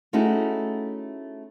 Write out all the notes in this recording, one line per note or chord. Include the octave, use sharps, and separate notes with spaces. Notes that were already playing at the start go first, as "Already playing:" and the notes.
A3 C#4 D#4 E4 F#4 G#4